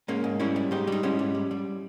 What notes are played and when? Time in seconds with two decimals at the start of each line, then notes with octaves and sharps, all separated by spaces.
0.08 G#2 A#3 C#4
0.24 G#2
0.40 G3 C#4 E4
0.56 G3
0.71 G#2 D#4 G4
0.87 G3 D#4
1.03 G#2 C#4 E4
1.19 G3
1.35 G3
1.51 G3